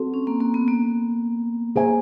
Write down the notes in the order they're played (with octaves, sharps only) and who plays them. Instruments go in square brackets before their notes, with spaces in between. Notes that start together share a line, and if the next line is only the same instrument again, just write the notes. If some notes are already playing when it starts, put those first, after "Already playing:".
Already playing: [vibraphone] C4 [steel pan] F#4 A4
[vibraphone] C#4
A#3
A#3
B3
A#3
[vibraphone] A#3 [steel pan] G#4 C5 E5 G#5